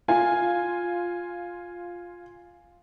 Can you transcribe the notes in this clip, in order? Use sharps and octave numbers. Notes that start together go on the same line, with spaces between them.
F4 G#5